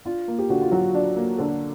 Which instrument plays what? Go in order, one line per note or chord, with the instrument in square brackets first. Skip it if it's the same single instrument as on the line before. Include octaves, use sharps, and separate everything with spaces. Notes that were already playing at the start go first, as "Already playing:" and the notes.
[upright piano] D4 [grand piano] F4
[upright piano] A#3
[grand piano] G4
[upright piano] D3 [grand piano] F#4
[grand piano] F4
[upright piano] F#3 [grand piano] F#4
[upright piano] D4
A#3
[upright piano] D3 [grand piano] A4